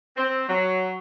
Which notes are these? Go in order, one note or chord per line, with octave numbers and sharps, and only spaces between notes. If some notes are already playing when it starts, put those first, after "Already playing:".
C4
F#3